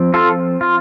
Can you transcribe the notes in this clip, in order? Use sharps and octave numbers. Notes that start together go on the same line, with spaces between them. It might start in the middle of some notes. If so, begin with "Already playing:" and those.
Already playing: F3 C4
F4 A4
F4